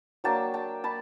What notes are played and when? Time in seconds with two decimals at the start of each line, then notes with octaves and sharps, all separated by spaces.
0.24 F#3 A#3 D4 G5 A5
0.54 G5 A5
0.84 A5 B5